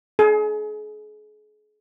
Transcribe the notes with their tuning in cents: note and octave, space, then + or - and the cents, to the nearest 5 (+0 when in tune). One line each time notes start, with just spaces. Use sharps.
G#4 +40